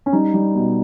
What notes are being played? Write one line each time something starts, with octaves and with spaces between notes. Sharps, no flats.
C#4
G3 D#4
G3
B2